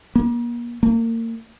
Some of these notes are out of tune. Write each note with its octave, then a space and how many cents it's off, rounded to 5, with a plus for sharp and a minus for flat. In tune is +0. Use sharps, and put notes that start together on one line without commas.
A#3 +35
A#3 -35